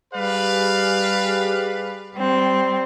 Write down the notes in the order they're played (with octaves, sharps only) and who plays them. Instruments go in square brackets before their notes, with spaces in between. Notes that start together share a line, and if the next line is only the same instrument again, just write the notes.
[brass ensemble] G3 G4 G#4 [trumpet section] B4 D5 F5
[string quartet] G3 C4